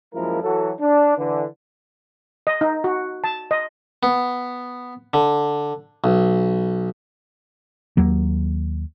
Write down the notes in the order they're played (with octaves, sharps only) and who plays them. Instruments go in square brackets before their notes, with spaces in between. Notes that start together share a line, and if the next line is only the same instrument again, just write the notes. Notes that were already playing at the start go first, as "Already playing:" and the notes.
[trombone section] F#2 F3 G#3 A#3 E4 A#4
E3 F#3 F#4 A4
D4
D3 E3
[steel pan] D#5
D#4
F#4
A5
D#5
[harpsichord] B3
D3
B1
[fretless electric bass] D#2 F#3 A#3